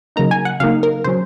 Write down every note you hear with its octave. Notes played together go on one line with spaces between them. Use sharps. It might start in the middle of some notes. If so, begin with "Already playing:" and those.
C#3 F#3 A#3 D#4 A#5
G#5
F#5
C#3 F#3 A#3 D#4 F5
A#4
C#3 F#3 C#4 C5